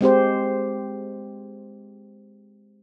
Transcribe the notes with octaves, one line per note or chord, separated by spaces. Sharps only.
G#3 C4 G4 C5